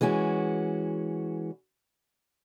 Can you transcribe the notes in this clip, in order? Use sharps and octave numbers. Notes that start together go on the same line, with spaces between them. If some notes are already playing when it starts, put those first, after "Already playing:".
E3 G#3 C#4 F#4